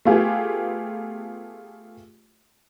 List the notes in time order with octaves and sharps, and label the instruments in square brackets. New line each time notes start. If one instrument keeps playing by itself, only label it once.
[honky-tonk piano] A3 B3 F4 G4 G#4